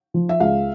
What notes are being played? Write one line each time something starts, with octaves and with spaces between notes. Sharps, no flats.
F3
E5
C#2 F5